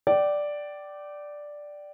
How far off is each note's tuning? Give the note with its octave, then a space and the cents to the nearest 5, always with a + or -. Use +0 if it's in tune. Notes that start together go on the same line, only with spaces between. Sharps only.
D5 +0 G5 -30